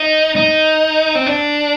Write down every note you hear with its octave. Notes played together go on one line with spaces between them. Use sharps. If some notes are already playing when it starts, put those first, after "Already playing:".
Already playing: D#4
D#4
C4
D4